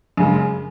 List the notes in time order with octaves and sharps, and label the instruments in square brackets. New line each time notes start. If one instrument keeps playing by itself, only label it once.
[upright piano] F#2 C#3 G#3